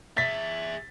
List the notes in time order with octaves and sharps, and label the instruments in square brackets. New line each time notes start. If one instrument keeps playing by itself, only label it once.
[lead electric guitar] G#4 E5 [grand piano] A6 B6